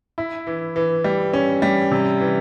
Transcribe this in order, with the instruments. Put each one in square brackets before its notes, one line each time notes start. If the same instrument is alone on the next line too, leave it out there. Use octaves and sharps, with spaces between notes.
[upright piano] E4
E3
E3
G3
C#4
G3
C3
E3